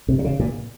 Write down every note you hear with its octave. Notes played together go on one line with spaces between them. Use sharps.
C3
C3
C#3
A#2